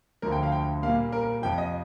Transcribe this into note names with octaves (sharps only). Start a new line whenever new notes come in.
D2 D3 F3 A#4
G5
F5
G5
A#2 G3 A#3 F5
A#4
A#4
F2 C3 F3 G5
D#5